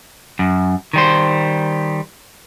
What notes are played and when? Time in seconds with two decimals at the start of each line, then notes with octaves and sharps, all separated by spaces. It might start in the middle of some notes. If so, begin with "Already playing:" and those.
0.39 F#2
0.93 D#3 G3 C5